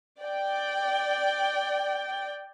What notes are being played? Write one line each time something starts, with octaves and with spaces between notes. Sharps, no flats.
D5 G5